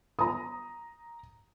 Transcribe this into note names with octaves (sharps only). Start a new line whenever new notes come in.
A#5 D#6